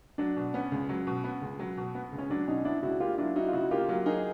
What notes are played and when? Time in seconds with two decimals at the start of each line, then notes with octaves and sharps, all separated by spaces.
0.18 F#3 D4
0.36 B2
0.54 B3 C#4
0.72 C#2
0.89 F#3
1.07 B2
1.24 B3
1.42 C#2
1.59 F#3
1.77 B2
1.95 B3
2.12 C#2
2.18 C#4
2.30 F#3 D4
2.47 B2 C#4 D#4
2.65 B3 D4 E4
2.83 C#2 E4 F#4
3.00 A#3 F4 G4
3.18 F#3 D4 E4
3.36 D#4 E4 F#4
3.48 F4
3.53 C#3 E4 F#4
3.71 A#3 F4 G4
3.89 F#3
4.06 D#4 G#4 A#4